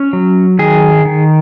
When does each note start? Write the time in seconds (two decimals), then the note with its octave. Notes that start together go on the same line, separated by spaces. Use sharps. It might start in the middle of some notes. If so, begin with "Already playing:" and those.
Already playing: C#4
0.13 F#3
0.59 D#3 G#4
1.05 D#3